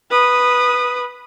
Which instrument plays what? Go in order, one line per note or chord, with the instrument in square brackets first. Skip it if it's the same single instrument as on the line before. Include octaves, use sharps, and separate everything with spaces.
[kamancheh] B4 D#6